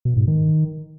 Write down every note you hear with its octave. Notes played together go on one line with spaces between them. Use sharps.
B2
G#2
D#3